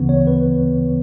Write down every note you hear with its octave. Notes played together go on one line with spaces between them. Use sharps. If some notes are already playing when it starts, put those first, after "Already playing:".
Already playing: D2 C#3 E3 B3
C#5
B4